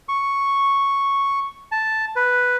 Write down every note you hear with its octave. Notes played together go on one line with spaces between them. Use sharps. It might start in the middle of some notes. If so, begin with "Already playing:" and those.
C#6
A5
B4